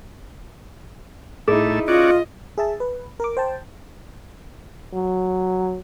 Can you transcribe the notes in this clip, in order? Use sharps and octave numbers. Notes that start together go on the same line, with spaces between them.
A2 A3 D#4 E4 G#4 E6
C#4 F4 F#4 D5 D#5
G#4 E5 A5
B4
A#4 D6
C5 G5 A5
F#3